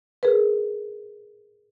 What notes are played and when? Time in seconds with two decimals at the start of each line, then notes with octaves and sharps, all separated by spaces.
0.23 G#4 A#4 B4